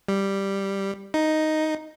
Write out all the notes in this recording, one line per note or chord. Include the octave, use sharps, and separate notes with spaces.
G3
D#4